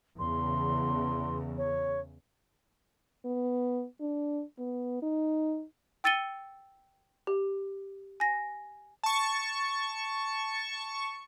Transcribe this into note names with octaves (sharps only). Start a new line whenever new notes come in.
E2 C#3 C6
C#5
B3
D4
B3
D#4
G5 E6 A6 C#7 D#7 G7
G4
G#5 A#6
A5 C#6